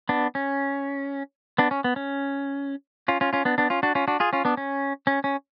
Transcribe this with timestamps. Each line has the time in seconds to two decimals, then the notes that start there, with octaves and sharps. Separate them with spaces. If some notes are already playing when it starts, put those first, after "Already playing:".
0.09 B3 D4
0.35 C#4
1.58 B3 D4
1.71 C#4
1.84 B3
1.96 C#4
3.08 C#4 F4
3.21 C#4 F4
3.33 C#4 F4
3.45 B3 D4
3.58 B3 D4
3.70 C#4 F4
3.83 D4 F#4
3.95 C#4 F4
4.08 D4 F#4
4.20 F4 G#4
4.33 C#4 F4
4.45 B3 D4
4.57 C#4
5.07 C#4
5.24 C#4